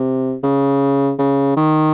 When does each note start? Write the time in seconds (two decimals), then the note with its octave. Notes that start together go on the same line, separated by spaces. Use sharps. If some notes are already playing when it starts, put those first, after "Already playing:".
Already playing: C3
0.43 C#3
1.19 C#3
1.57 D#3